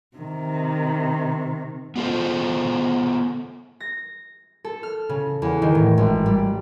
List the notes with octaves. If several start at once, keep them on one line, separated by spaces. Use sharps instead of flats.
C3 D#3
B3 F4 A4 C5
A#6
A4
F6
C#3
E2
D#3
A2
G#1
G3